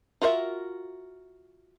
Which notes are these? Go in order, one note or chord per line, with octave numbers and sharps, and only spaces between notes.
F4 F#4 A#4 C5 E5